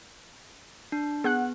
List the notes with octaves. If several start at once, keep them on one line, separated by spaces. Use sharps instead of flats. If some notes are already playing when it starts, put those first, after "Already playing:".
D4
B3 G#4 F#5 F#6